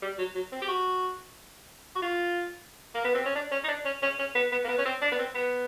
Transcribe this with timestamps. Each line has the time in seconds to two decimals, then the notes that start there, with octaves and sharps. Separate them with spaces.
0.02 G3
0.18 F#3
0.35 F#3
0.52 C4
0.62 G4
0.68 F#4
1.96 F#4
2.02 F4
2.95 A#3
3.05 B3
3.15 C4
3.25 C#4
3.35 D4
3.52 C#4
3.64 D#4
3.69 D4
3.85 C#4
4.03 C#4
4.19 C#4
4.35 B3
4.52 B3
4.64 A#3
4.68 B3
4.78 C#4
4.86 C4
5.02 D4
5.12 B3
5.19 C4
5.35 B3